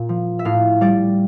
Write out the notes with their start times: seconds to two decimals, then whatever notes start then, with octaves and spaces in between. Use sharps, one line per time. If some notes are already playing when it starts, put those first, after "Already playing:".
Already playing: A#2
0.09 F3
0.39 E5
0.45 A2 F5
0.81 G3 D5